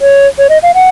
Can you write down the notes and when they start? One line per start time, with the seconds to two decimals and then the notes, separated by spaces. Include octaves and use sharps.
0.01 C#5
0.39 C#5
0.50 D#5
0.63 F5
0.75 F#5